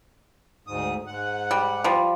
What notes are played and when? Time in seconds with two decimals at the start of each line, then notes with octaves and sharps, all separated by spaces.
0.67 D2 G#2 D#6
1.07 G#2 F#5
1.51 G3
1.84 F3 G3